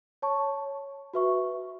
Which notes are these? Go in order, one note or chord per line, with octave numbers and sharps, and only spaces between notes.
C#5 A5 C#6
F#4 B4 E5 C#6